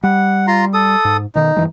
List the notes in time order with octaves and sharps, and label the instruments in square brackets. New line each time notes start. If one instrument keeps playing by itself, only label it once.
[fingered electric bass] G3 [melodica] F#5
[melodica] F4 A#5 C6
A4 D#6
[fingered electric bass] G#2
[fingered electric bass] B2 D#3 [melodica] D#4
[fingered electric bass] G2 E3 G#3